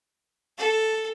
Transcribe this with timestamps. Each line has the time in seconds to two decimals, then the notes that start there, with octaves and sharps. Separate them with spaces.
0.58 A4